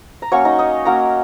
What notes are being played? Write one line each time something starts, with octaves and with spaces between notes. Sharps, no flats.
A#5
F#3 A#3 C#4 C#5 C#6
D#4 D#5
D#4 D#5
F#3 A#3 C#4 A#4 A#5